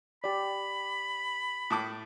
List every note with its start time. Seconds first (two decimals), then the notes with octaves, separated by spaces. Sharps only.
0.24 G4 D5 B5
1.70 A2 A5 D6